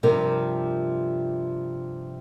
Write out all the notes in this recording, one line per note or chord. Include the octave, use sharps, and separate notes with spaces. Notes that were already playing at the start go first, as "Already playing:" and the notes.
G2 C3 F3 A#4